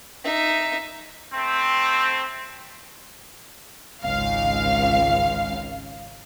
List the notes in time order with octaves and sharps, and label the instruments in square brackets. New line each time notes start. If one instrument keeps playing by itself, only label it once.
[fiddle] D#4 E5
[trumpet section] A3 C4
[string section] G#1 C#2 F5